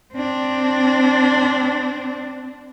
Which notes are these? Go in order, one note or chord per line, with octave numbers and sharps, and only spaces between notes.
C4 D4